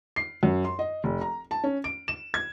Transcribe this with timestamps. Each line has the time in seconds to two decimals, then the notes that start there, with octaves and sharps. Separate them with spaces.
0.16 C7
0.43 F#2
0.65 C6
0.79 D#5
1.04 F1
1.21 A#5
1.51 A5
1.64 C#4
1.84 D7
2.08 E7
2.34 G#6